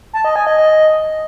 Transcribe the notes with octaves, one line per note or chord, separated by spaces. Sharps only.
A5
D#5
G#5
D#5
D#5